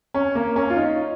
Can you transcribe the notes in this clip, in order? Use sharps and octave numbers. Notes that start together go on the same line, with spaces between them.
C#4
A#3
C#4
F4
D#4